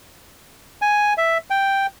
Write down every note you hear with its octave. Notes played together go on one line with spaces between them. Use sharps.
G#5
E5
G5